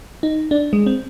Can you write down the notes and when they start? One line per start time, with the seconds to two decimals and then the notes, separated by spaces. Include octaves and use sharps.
0.23 D#4
0.51 D4
0.73 G#3
0.86 C4